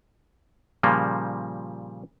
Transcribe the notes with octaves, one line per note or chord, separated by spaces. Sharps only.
A#2 C#3 F3 G3 A#3